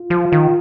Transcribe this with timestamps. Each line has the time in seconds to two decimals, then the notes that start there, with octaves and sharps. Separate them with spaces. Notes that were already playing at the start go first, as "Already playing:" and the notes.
Already playing: F4
0.10 F3 F4
0.32 D#3 F4